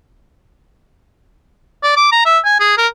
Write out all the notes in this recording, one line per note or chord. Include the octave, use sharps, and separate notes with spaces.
D5
D6
A#5
E5
G#5
G#4
A#4